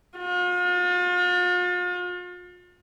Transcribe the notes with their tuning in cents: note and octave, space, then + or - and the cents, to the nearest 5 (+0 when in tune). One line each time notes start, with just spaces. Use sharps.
F4 +40